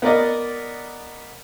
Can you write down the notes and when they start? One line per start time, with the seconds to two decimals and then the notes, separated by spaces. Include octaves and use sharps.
0.02 B3 A#4 D5 D#5